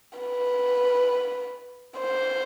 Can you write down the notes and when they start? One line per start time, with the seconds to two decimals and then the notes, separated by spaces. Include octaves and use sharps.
0.19 B4
2.00 C5